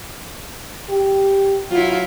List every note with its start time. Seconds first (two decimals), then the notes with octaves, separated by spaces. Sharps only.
0.90 G4
1.71 F#3 E4 F4